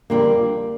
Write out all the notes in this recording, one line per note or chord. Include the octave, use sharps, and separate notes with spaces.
F2 D3 G3 A#3